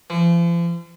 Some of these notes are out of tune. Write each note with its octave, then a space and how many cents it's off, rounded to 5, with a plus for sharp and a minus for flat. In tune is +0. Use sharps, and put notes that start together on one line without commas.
F3 -45